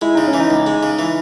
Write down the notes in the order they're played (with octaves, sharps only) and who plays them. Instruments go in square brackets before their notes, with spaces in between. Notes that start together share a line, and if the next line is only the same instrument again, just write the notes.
[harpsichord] G#3 [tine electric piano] E4
[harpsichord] C#3 [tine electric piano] D#4
[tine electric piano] C#4
[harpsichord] E3
[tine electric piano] D#4
[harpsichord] C#2
G#3
C#3
E3